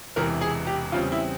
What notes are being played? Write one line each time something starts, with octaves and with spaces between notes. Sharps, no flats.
E1 E2 C3 E3 A#4
G#4
G4
E2 C#3 G3 C4 F4
E4